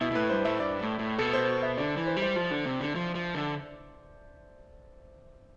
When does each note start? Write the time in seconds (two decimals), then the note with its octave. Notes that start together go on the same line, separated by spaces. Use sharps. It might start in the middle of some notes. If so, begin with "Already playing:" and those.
0.01 B2 E4
0.11 B2
0.15 A2 B4
0.30 G2 C5
0.45 A2 E5
0.60 G2 D5
0.79 A2
0.99 A2
1.18 B2 A4
1.33 C5
1.63 E5
1.77 D3 D5
1.97 E3
2.07 C5
2.17 G3
2.22 C5
2.36 F3
2.51 D3
2.66 C3
2.80 D3
2.95 F3
3.15 F3
3.35 D3